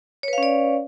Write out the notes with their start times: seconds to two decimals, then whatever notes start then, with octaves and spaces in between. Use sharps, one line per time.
0.23 C#5
0.28 B4
0.33 F5
0.38 C#4
0.43 D5